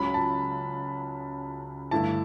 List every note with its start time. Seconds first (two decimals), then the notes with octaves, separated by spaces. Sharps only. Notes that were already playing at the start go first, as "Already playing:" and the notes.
Already playing: C#2 C#3 F#3 B5
0.14 A5
1.91 G2 D3 A3 E4 A5